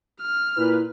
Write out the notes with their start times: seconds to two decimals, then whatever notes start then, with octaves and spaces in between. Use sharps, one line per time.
0.20 F6
0.57 A#2 E4 B4